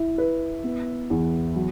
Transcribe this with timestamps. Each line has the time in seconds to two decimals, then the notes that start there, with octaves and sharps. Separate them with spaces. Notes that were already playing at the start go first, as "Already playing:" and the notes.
Already playing: E4
0.18 B4
0.64 B3
1.10 E2
1.56 F#3